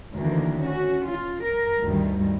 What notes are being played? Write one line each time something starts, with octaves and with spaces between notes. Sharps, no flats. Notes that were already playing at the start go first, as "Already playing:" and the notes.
D2 D#3 E3 A#3
C#4 F#4
F4
A#4
D2 G2 D#3 G3